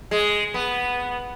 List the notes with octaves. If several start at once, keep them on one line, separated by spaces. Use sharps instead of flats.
G#3
B3